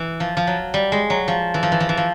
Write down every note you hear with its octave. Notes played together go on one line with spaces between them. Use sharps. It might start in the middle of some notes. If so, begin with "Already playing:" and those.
Already playing: E3
F3
F3
F#3
G3
G#3
F#3
F3
E3
F3
E3
F3
E3
F3